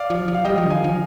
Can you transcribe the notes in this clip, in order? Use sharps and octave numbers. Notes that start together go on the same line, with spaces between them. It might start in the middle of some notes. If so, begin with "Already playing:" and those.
Already playing: D5 F5
F3
F3
F5
G3 D#5 G5
F3
D3
D#3 F5 G#5
F3